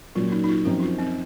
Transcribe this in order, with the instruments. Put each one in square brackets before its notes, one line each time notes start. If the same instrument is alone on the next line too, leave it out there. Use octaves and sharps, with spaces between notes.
[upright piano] A#2 F#3 A#3 C#4 [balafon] F4
[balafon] D#4
D#4
F4
[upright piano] F#2 F3 C4 D#4 A#4 [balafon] F#4
[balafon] F4
C4